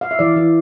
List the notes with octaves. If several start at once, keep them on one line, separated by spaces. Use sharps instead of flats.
F5
E5
E3 D5
E3